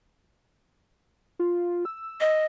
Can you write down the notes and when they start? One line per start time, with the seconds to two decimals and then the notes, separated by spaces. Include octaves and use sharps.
1.39 F4
1.85 E6
2.20 D#5